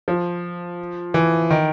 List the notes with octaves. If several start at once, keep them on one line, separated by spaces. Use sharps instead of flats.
F3
E3
D#3